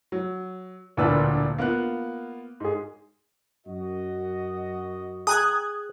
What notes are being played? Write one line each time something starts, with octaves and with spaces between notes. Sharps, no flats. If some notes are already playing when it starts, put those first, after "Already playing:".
F#3
E1 D2 A#2 D4 B4 E6
A#3 B3 F4 F#6
G#2 G#4
F#2 F#4 D#5
G#4 G5 A#5 D#6 F#6 G#6